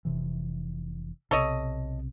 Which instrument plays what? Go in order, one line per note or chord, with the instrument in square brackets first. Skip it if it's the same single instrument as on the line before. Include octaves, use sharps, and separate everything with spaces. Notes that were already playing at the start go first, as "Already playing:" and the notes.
[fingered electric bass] F1 C3 E3
[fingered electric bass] B1 C3 [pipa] A4 C#5 D#5